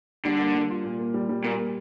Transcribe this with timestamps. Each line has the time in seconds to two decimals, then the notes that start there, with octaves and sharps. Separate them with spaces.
0.25 D3 G3
0.39 A#3
0.55 G3
0.69 F4
0.84 A#2
0.99 A#3
1.14 G3
1.29 G3
1.44 A#2 A#3
1.58 A#3